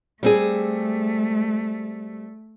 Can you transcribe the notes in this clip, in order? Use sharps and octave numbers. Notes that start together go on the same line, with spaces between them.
G3 A3 C4 G#4